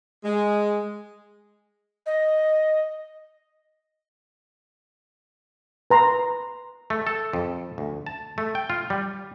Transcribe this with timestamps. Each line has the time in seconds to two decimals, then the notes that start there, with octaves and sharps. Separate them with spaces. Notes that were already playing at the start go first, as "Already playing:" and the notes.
0.23 G#3
2.06 D#5
5.91 B4 A#5 C6
6.90 A3
7.07 A4
7.33 F2
7.78 D2
8.07 A5
8.38 A3
8.55 G5
8.70 F4
8.90 G3